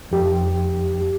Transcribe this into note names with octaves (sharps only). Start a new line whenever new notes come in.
F2 G4